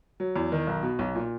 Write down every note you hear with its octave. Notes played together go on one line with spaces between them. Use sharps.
F#3
E2
D#3
B1
B2
B1
A#2